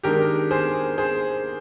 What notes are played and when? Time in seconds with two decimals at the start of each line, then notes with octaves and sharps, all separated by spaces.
0.03 D#3 G#3 D4 G4 A#4
0.51 G#4 C5
0.98 G#4 C5